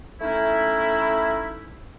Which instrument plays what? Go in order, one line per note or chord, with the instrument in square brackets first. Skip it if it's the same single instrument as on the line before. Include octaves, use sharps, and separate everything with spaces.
[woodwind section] A3 C#4 D#4 E4